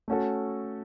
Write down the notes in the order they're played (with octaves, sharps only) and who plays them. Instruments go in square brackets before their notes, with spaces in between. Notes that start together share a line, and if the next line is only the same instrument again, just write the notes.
[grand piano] A3 C#4 F#4 A4